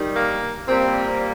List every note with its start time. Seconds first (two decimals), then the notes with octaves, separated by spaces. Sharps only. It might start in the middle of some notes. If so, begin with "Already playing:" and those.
Already playing: D#3 G3
0.15 A#3
0.67 A#2 G3 A#3 C4